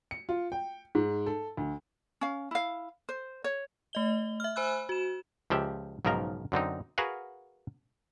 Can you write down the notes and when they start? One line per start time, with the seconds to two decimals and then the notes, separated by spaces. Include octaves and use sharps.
0.11 C#7
0.29 F4
0.52 G5
0.95 G#2
1.26 A4
1.57 D2
2.21 C#4 F5
2.51 E4 F5
3.09 C5
3.44 C#5
3.93 A3 D#5 G7
4.40 E5 F6
4.56 C5 G#5 B5 E6 F#6
4.89 F#4 E7
5.50 C#2 F3 G4 E5
6.05 B1 G#2 C#3 F3 A#4 A#5
6.52 F#2 D3 C4 D#4
6.98 F#4 G#4 A#4 B4 F5 F#5